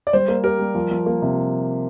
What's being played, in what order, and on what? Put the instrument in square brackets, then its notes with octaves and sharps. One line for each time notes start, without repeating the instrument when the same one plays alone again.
[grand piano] D5
[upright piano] G3 [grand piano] C5
[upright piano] A#3
[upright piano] G4 [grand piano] A#4
[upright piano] G3
F3
F3
A#3
C3